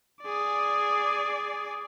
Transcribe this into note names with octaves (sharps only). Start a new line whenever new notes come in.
G#4 D5